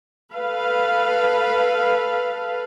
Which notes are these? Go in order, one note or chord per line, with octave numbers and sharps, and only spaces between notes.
A4 B4 F5